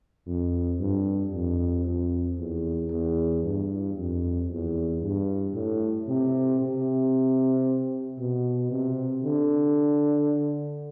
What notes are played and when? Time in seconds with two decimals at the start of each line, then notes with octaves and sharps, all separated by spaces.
0.26 F2
0.79 G2
1.32 F2
1.85 F2
2.38 E2
2.91 E2
3.44 G2
3.96 F2
4.49 E2
5.02 G2
5.54 A2
6.08 C3
6.60 C3
8.19 B2
8.71 C3
9.24 D3